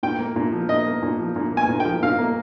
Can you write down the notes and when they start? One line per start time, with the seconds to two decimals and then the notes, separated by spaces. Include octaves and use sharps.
0.03 A#2 G5
0.19 A#3
0.36 A#2
0.52 F3
0.69 A#2 D#5
0.86 A#3
1.03 A#2
1.19 F3
1.36 A#2
1.52 A#3
1.57 G#5
1.69 A#2
1.80 G5
1.85 F3
2.03 A#2 F5
2.18 A#3